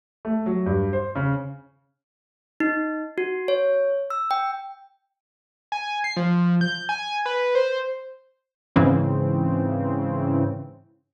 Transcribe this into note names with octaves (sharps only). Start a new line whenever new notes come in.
A3
F#3
G2
C5
C#3
D#4
F#4
C#5
E6
G5
G#5
C7
F3
G6
G#5
B4
C5
G#2 C#3 E3 C4 C#4